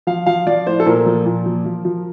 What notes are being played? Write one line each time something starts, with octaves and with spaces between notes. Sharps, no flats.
F3 F5
F3 F5
F3 D5
A2 C5
A4
A#2 A#4
F3
A#2
F3
F3
F3